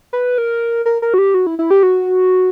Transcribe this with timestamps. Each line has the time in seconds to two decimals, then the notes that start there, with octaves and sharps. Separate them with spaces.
0.13 B4
0.38 A#4
0.86 A#4
1.02 A#4
1.14 F#4
1.18 G4
1.34 F#4
1.47 E4
1.59 E4
1.71 G4
1.83 F#4